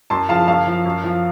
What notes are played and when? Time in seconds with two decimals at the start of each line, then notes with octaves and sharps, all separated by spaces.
0.10 F#2 A5 C6
0.29 C#3 F3 F5 A5
0.47 F#2 F5 A5
0.67 F3
0.85 F#2
1.04 F3